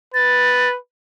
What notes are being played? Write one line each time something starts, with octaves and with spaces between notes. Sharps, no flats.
B4 A6